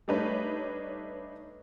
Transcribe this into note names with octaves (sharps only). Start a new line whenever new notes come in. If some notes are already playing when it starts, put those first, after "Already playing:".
G3 A3 D4 D#4 B4 C#5